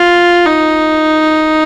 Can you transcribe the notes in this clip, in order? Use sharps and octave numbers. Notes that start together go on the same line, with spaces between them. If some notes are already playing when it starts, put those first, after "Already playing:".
Already playing: F4
D#4